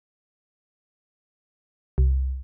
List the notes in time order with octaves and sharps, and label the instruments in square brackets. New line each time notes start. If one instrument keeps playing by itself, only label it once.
[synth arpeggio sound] C2